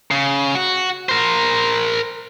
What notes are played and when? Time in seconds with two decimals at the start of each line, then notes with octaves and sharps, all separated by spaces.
0.11 C#3
0.55 F#4
1.09 A#4 C5